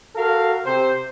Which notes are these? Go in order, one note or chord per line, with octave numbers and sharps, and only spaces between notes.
F#4 A4 A#4 F5
C3 C4 C5